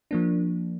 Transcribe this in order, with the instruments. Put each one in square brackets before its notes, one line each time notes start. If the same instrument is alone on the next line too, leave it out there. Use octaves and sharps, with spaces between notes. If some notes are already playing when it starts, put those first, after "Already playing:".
[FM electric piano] F3 A#3 D4